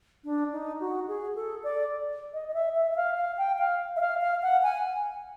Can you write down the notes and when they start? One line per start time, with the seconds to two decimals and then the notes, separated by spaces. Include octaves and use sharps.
0.24 D4
0.52 D#4
0.80 F#4
1.08 G#4
1.35 A4
1.64 D5
2.34 D#5
2.48 D#5
2.54 E5
2.75 E5
2.92 E5
2.96 F5
3.17 F5
3.38 G5
3.59 F5
3.96 E5
4.00 F5
4.21 F5
4.42 F#5
4.63 G#5